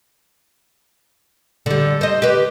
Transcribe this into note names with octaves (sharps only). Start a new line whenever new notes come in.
D3 G3
C5 D#5
G4 B4